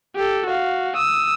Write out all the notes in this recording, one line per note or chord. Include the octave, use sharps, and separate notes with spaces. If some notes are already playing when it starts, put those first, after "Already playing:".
G4 A4
F#4 F5
D#6 E6